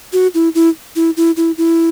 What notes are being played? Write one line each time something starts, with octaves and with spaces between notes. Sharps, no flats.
F#4
E4
E4
E4
E4
E4
E4